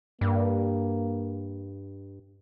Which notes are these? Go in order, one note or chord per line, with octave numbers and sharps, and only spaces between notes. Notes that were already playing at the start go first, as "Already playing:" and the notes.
G2 A#3